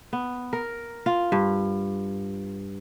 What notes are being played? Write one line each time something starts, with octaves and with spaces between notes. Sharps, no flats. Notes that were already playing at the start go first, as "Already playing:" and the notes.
B3
A#4
F4
G2